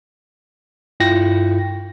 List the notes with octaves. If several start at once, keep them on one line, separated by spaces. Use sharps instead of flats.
G2 E4 F4 G5 A#6